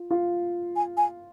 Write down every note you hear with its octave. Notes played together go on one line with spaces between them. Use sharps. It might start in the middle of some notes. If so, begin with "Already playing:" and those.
Already playing: F4
F4
G#5
G#5